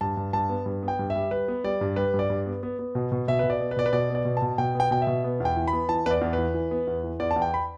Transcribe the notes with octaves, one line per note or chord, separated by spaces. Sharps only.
G2 A5
G2
G2 A5
B3
G2
B3
G5
G2
E5
G3
G3 B4
B3
G3 D5
G2
G3 B4
G2
D5
G2
B3
B3
B3
B2
B2
B2 E5
B2 B4
D5
B3
B4
B2 D5
B4
B2 D5
B3 D5
B2
A5
B2
B2 G5
B3 G5
B2 G5
E5
B2
B3
E2
G5
E3
B5
B3
E3 A5
E2 B4 D5
E2
E3 B4
E3
B3
E2
E3
E2 D5
A5
E2
G5
B5